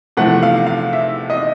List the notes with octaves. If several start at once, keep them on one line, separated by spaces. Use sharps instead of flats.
E2 C3 F3 A3 F#5
F5
F5
E5
D#5